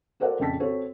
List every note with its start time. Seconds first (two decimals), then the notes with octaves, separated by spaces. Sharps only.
0.20 F#4 A4 A#4 C5 D5 F#5
0.39 A#1 F2 C#3 G5 A5 B6
0.60 C4 F#4 A4 C#5